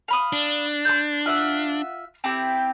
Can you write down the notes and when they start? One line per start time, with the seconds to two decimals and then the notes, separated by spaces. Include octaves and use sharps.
0.08 F5 B5 D#6
0.33 D4
0.85 C6 F6 G6
1.26 F4 E5 F#5
2.24 C4 E4 G4